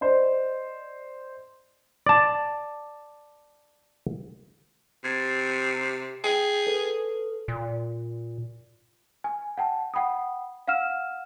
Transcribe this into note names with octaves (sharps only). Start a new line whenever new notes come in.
C5 D5 D#5
D5 A5
C3 G#6 A6
G#4 G5
A4 B4
A#2
G#5
F#5 G5 A5
F#5 G5 B5 D#6
F5 F#5 E6 F6 E7